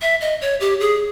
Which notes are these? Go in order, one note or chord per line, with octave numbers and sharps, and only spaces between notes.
E5
D#5
C#5
G4
G#4